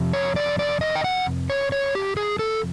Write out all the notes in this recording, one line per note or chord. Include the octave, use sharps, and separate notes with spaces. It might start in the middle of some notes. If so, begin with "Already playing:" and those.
Already playing: F2 C3
C#5
D5
D5
D#5
G5
F#5
C#5
C#5
G4
G#4
A4